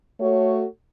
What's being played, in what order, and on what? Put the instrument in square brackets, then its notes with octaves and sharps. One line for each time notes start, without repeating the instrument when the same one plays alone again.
[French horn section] A3 F#4 A4 C#5